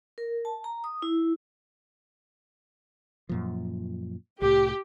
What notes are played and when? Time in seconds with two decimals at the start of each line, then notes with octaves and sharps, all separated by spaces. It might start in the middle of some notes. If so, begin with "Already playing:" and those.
0.18 A#4
0.45 A5
0.64 A#5
0.84 D#6
1.02 E4
3.29 F#2 A#2 F3
4.42 C2 A2 G4